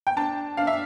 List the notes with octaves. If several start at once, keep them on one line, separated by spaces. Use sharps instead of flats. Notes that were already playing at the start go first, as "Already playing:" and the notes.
G5
D4 A5
D4 F5
E5